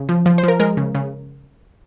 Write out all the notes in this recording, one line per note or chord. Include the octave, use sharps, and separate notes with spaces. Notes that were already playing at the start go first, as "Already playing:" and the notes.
Already playing: C#3
F3
F3
C5
F3 A#4
G#3 A#4
C#3
C#3